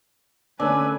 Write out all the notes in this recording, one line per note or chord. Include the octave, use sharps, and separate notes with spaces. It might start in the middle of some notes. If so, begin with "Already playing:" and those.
D3 A3 C#4 D4 B4 G#5 E6